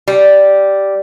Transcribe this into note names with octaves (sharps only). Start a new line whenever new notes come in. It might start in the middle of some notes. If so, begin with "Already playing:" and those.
G3